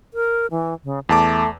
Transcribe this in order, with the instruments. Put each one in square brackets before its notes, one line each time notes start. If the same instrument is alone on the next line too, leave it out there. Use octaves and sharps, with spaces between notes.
[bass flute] A#4
E3
C#3
[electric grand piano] E2 A5 D6 [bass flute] A3